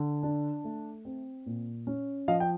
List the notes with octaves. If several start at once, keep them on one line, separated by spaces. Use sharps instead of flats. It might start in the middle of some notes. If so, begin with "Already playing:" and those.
Already playing: D3
D4
A3
C4
A#2
C#4
F3 D#5 F5
G5